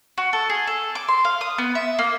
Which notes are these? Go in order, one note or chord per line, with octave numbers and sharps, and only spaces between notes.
F#4
A4
G#4
A4
D6
C6
F5
D#6
B3
E5
A#3